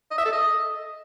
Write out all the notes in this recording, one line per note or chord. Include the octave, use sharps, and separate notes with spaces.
D#5
E5
A4
D#5